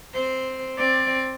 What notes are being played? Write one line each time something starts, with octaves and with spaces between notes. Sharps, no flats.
C4 C5
C4 D5